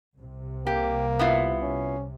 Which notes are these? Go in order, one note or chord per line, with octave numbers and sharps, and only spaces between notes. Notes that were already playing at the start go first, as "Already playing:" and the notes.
C2 C3
A#3 G4
B3 E4 F4
C#4